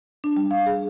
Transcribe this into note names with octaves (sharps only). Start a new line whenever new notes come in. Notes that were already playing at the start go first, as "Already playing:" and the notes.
D4
G3
F5
G#4